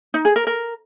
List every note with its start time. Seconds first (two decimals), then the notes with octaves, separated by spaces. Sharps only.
0.14 D#4
0.25 G#4
0.36 A#4
0.47 A#4